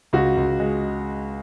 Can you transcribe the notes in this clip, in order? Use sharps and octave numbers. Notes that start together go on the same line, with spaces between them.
C#2 F#4
C#2
G#3